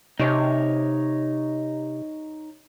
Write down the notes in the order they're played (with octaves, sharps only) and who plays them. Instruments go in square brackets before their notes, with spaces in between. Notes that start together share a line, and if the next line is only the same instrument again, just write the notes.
[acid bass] C3 [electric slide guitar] D#4 C#5